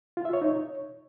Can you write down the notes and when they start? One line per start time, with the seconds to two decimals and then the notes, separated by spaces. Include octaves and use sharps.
0.17 F4
0.25 E5
0.33 C#5
0.42 D#4
0.50 C#5